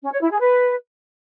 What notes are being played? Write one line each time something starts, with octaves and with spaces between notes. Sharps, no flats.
C#4
C#5
E4
G#4
B4